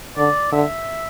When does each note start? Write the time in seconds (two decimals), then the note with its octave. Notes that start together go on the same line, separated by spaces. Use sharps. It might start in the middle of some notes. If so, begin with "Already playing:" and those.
0.17 D3 D5
0.52 D3 E5